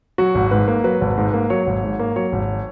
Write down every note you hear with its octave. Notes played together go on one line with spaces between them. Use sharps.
F#3 F#4
G#1
G#2 B4
A#3
F#3 B4
G#1
G#2
A#3
F#3 C#5
G#1
G#2
A#3
F#3 C#5
G#1